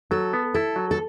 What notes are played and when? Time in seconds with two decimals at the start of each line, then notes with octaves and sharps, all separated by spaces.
0.11 F#3 A4
0.33 B3
0.54 E4 A4
0.76 F#3
0.91 A4